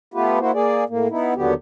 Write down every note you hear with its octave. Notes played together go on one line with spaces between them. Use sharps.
A3 B3 F4 G4 B4
A#3 E4 F#4 C5
A#3 G#4 D5
A2 A#3
B3 D#4 E4
D#2 D3 F#3 B3 G4